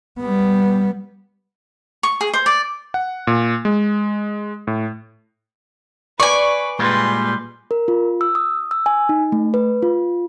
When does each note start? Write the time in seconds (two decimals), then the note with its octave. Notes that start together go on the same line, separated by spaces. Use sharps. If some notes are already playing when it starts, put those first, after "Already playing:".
0.20 G3 B3
2.03 C#6
2.21 G#4
2.34 C5
2.46 D5
2.94 F#5
3.27 A#2
3.65 G#3
4.67 A2
6.20 B4 D5 G#5 C#6
6.79 A#2 G3 G#3 B4 C6
7.71 A#4
7.88 F4
8.21 E6
8.35 D#6
8.71 E6
8.86 G#5
9.09 D#4
9.32 A3
9.54 B4
9.82 F4